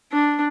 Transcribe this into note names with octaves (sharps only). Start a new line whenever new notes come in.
D4